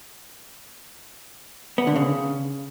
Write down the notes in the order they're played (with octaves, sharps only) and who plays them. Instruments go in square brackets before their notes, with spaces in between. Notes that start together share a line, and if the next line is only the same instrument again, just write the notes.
[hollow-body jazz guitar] B3
D3
C#3